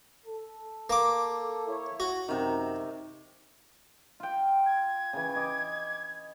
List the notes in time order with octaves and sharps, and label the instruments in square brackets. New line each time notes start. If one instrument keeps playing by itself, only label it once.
[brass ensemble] A4
[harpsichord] A#3 D6
[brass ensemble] E4 C#5
[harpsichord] F#4
[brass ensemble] F#2 [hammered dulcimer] C3 D#3
[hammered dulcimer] F4 G5
[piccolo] G#6
[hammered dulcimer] C#3 E3
D#5 D6